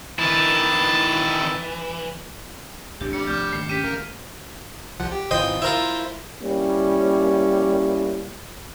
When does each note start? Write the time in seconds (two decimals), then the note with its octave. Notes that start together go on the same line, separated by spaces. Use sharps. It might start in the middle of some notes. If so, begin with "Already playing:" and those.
0.19 D#3 E3 E4 A5
3.01 A1 F2 A2 D4 G4
3.13 G3 C#7
3.27 C2 F3 A3 D6 F6 G6
3.53 G#1 D#2 D#3 A3
3.69 C#4 G4 B6 D#7
3.83 G#1 A#3
5.00 C2 F3 F#5
5.12 G4
5.31 G#1 E3 F4 C5 D#5 G5
5.62 E4 F4 A#4 C5 E5
6.42 G3 A#3 C#4 E4